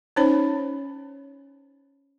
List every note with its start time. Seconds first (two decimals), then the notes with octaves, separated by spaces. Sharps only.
0.16 C#4 D#4 C5 C#5 B5